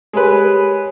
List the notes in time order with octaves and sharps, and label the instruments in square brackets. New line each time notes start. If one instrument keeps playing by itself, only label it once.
[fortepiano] G#3 B4 [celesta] G4 A#4 C#5